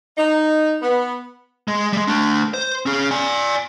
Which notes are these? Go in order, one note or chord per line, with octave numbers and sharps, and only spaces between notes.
D#4
B3
G#3
G3 G#3
A3 D4
C5
C#4 G#4
D5 G#5